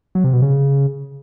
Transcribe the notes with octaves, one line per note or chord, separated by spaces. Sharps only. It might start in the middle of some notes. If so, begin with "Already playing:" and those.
F#3
C3
B2
C#3